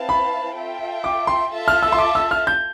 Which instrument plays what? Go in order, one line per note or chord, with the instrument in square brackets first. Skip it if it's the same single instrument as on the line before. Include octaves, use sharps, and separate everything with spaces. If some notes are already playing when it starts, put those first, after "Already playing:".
Already playing: [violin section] C4 E4 B4 F5 A5
[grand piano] B5
[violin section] F4 A4 E5 G5
[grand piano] D6
C6
[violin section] F4 A4 E5 A5
[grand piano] F6
E6
C6
D6
E6
F6
G6